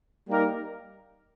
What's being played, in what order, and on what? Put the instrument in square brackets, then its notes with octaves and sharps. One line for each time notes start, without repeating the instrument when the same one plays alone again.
[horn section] G3 A#3 D#4 G4 A#4